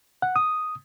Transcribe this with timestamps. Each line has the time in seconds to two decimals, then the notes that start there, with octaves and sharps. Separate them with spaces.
0.22 F#5
0.36 D#6